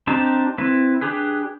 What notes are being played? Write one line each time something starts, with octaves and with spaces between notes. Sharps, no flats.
C4 D4 D#4 G4 A5
C4 E4 B4
D4 G4 G#4 B4